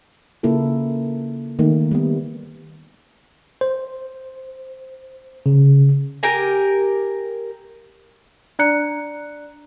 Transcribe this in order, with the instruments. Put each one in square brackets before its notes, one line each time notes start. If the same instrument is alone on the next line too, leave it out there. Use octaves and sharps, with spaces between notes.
[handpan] C#3 A#3 E4 F4 A4
D#3 A3 A#3
G3 B3
[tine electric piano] C5
C#3
[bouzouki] G4 A#4 G#5
[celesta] D4 D5 A#5 F#6 C#7